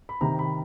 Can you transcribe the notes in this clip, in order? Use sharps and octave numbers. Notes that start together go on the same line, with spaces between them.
B5
C3 D#3 A#5
B5